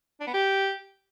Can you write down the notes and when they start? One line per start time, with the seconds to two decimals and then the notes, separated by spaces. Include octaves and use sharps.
0.20 D4
0.27 B3
0.34 G4